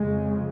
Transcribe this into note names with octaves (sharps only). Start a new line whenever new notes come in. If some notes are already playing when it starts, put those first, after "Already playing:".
Already playing: F2 C#3 G#3